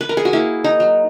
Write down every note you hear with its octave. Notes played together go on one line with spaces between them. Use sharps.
B4
A#4
G#4
F#4
A#3 E4
D#4
F#3